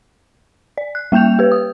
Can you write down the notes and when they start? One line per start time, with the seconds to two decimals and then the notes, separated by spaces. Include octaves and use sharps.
0.78 D5
0.95 F#6
1.12 G3 A#3 G5 G6 F7
1.39 G4 B4
1.52 D#6